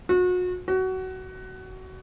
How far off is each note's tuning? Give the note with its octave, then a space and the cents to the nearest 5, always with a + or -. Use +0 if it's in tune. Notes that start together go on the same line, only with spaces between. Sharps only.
F#4 -35
F#4 +20